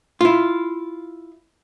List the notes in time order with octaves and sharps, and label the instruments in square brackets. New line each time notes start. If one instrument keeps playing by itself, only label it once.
[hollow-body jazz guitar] E4 F4